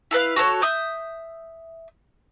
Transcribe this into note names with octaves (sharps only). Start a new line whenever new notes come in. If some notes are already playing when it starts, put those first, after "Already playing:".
E4 A4 B4 F5
F#4 A4 A#4 C#5
E5 D#6 G6